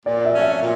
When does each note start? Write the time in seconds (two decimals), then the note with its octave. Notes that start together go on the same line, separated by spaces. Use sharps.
0.06 A#2 D5
0.25 E5
0.33 F#3 A3 C#4
0.42 E5
0.60 A#2